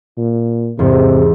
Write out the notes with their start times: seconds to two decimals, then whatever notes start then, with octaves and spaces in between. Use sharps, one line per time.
0.18 A#2
0.79 E2 G#2 C3